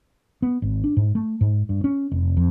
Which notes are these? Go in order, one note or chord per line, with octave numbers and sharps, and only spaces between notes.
B3
G#1
D4
G#2
A3
G#2
G2
C#4
F1
F2